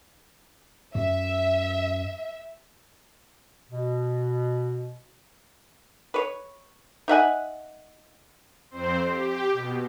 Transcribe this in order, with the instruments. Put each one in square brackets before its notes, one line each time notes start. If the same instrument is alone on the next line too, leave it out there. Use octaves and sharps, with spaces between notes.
[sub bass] F#2 [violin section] E5
[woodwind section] B2
[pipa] B4 C#5
D#4 E5 F#5 G#5
[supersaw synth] F2 C4 C5
G4
B2